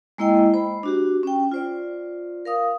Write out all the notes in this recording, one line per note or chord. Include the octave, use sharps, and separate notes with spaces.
G#3 A#3 E4 D#5 G5
C5 B5
D4 F#4 G4
C#4 G5
F4 C5 D5
A#4 F5 D#6